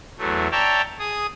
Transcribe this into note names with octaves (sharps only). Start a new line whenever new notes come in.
E2 F#3 A3
C#5 D5 E5 G5 A5 A#5
G#4 D#6